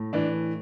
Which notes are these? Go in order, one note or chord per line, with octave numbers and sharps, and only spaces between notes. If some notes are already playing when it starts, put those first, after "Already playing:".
Already playing: A2
E3 D4